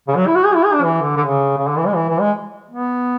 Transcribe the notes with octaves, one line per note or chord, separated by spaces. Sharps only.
C#3
F#3
E4
F#4
G#4
E4
G#4
D4
E3
D3
D3
C#3
C#3
D3
E3
G#3
E3
E3
G#3
B3